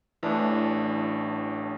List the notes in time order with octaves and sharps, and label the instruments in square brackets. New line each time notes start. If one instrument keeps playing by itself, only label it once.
[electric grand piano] A1 A2 [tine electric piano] E3 D4